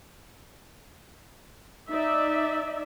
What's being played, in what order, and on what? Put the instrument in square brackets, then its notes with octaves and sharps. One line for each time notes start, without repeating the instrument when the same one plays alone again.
[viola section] D#4 D5 E5